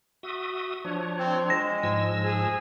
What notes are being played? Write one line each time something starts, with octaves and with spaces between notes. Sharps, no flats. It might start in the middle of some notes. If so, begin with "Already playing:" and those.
F#4 E5 D#6
F3 D4 C#5
C4
G#3 A#6
G#2 F3 E6
G#4